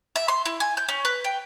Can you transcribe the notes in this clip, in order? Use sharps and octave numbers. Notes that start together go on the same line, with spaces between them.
E5
C6
E4
G#5
G6
C#4
B4
G5